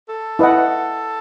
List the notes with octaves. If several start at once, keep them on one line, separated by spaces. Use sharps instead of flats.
A4
E4 B4 D#5 F#5